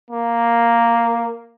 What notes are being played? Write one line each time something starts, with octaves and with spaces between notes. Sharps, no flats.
A#3